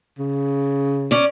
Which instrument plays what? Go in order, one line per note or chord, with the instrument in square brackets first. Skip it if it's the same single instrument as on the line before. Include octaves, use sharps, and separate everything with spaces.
[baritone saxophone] C#3
[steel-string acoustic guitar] C#4 D5